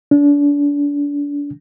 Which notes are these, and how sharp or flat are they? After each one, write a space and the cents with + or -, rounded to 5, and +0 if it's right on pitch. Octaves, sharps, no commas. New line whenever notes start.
D4 -30